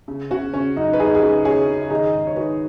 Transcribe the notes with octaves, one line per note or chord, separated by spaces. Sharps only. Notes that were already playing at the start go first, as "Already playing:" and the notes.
C#3
C#3 C#4 F#4
C#3 C#4
F#2 D#4
B4
F#2 D#4 G#4
G#4
C#3 F#4 B4
C#3 G#4 C#5
C#3
D#3 D#4 G#4
G#2
C#5
D#3 F#4 B4